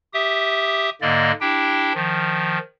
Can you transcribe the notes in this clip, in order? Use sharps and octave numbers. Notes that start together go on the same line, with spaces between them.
G4 E5 D#6
G#2 D3 A#3 D5 D#5
D4 E4 G4 G5
D#3 F3